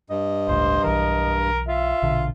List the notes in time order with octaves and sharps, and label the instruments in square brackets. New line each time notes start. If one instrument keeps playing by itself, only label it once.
[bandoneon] G2 [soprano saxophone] D#5
[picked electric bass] G1 C#2 A2 [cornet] C5
[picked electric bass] B1 E3 [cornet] A#4
[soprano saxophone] F4 [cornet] E5
[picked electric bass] A#1 B2 D3